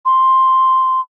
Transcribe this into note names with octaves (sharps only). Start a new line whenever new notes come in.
C6